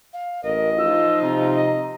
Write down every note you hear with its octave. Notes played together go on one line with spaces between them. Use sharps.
F5
A1 A#4 D#5
F3 D#4 F4 E6
C3 A#5
D#5